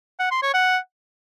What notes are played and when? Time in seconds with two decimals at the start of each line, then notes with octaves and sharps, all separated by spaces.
0.20 F#5
0.31 C6
0.42 C#5
0.54 F#5